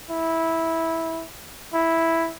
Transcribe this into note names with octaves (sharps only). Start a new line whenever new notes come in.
E4
E4